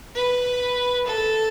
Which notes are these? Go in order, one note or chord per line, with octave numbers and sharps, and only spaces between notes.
B4
A4